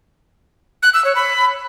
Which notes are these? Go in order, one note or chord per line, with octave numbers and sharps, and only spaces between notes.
F#6
E6
C#5
B5